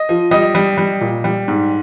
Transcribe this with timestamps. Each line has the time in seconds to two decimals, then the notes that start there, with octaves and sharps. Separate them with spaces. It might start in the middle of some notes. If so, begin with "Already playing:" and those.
Already playing: D#5
0.09 F3
0.31 G3 D#5
0.55 G3
0.78 G3
1.01 A#2
1.24 G3
1.48 G#2